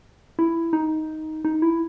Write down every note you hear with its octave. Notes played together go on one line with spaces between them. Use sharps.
E4
D#4
D#4
E4